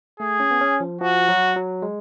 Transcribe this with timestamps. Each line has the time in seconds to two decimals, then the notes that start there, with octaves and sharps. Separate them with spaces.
0.20 A3 G#4
0.40 C#4
0.51 B3
0.61 C#4
0.80 F3
1.01 F3 F#4
1.29 F#3
1.56 F#3
1.82 G#3